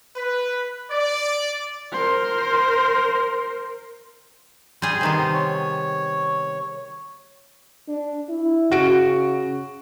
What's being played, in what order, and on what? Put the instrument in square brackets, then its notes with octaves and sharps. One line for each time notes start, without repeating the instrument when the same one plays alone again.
[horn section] B4
D5
[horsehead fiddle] A#4 C5
[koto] G3 G#4 [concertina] C6
[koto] C3 D#3 B3
[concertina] C#5
[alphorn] D4
E4
[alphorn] C#3 [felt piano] F#4 D7